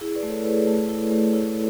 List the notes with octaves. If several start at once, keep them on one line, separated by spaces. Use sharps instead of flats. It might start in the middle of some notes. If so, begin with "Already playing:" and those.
E4 G#4
B4 D5
A3
A4 C#5
E4 G#4 B4
A3
E4
A3
E4 A4 C#5